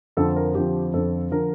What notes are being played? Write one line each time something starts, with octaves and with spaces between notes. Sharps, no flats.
F2 D3 F3 A4
A#4
F2 D3 F3 G4
F2 D3 F3 A4
D3 F3 A#4